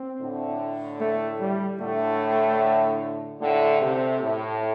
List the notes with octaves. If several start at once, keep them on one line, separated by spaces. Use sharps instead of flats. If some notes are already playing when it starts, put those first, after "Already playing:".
Already playing: C4
A2 D3
A3
G3
A2 D3 A3
A2 D3 A3
C3
A2